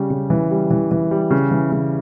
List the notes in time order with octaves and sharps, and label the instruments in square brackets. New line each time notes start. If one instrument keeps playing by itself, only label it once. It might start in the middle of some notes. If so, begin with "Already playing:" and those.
Already playing: [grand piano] C#3 G3
C#3
E3
G3
E3
E3
G3
C#3
E3
C#3